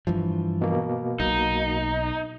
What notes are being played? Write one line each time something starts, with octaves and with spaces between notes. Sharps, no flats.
G2 E3 F3
B2 A#3
B1 D#4